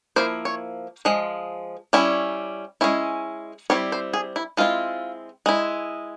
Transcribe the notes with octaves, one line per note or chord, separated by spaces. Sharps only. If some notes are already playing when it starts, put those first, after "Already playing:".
F3 A#3 E4 C5
C#5
F3 G#3
G3 C#4 E4
G#3 C#4 E4
G3 C4 E4 C#5
C5
G#4
E4
G#3 C4 E4 F4
G#3 E4